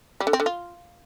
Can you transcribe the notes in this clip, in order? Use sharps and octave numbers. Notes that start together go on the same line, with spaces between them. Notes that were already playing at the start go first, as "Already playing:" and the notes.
G3
D3
C4
D3
F4